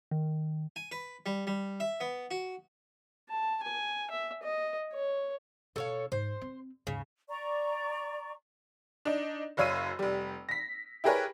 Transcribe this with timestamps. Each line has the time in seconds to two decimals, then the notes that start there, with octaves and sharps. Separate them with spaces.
0.11 D#3
0.76 G#5
0.92 B4
1.26 G3
1.47 G3
1.80 E5
2.00 B3
2.31 F#4
3.30 A5
3.63 G#5
4.11 E5
4.42 D#5
4.93 C#5
5.76 B2 A4 C#5 F5
6.12 G#2 C5
6.41 C4
6.87 D#2 G#2 C#3
7.28 D5 A#5 C#6
9.05 D4 D#4
9.57 F#1 F#2 C#5 F5 E6 D#7
9.99 F1 G3
10.49 A#6 B6
11.04 E4 G4 G#4 A#4 B4 C#5